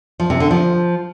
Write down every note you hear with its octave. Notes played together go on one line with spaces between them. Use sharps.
F3
C3
D3
F3